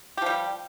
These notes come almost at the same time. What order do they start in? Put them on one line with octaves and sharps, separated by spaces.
G4 F3 G3